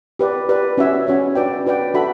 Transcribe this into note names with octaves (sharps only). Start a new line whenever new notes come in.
G4 B4 D5
G4 B4 D5
C#4 F#4 C#5 E5
C#4 F#4 C#5 E5
D4 F#4 B4 D5 G5
D4 F#4 B4 D5 G5
D4 F#4 A4 E5 B5